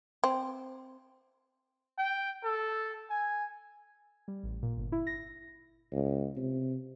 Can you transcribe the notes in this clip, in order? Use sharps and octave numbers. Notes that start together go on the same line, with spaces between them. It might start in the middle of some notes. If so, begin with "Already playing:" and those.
C4
G5
A4
G#5
G3
A1
A#2
G1
E4
A#6
C#2
C3